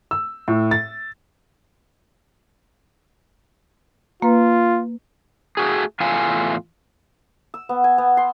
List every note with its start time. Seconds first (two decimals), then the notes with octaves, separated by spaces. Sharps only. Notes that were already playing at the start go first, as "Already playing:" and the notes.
0.11 E6
0.48 A2
0.71 A6
4.22 A#3 F4 B4
5.57 A3 F#4 G#4
6.00 E2 A2 A3 F4 F5 G#5
7.54 E6
7.69 B3
7.84 G#5
7.98 B3
8.17 C6